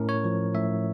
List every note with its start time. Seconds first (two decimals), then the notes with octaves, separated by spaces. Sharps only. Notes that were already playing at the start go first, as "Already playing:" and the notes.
Already playing: A2 C#4 A#4
0.09 C#5
0.24 F3
0.55 A2 E5